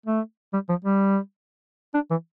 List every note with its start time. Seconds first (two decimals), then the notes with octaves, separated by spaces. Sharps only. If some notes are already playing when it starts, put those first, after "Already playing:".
0.06 A3
0.53 G3
0.69 F3
0.84 G3
1.94 D4
2.11 E3